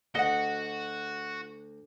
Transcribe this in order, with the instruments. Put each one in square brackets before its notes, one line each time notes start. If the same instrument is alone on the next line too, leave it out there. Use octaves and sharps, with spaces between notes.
[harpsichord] D2 [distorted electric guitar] F#4 [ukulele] D#5 F#5